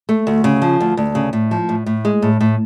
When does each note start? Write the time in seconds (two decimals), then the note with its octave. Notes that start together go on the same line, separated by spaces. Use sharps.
0.09 A3
0.27 D2
0.44 C#3
0.62 F3
0.80 D2
0.97 D2
1.15 C#3
1.33 A2
1.51 F3
1.69 A2
1.86 A2
2.05 G#3
2.22 A2
2.41 A2